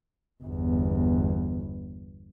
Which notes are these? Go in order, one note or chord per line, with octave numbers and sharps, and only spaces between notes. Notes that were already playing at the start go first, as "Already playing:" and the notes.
G1 E2